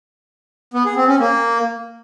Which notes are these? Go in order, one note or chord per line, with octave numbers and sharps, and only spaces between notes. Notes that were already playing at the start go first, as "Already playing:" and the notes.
B3
G#4
C4
C#4
A#3